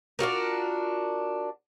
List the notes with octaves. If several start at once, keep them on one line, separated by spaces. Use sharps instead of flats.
D4 F4 F#4 A#4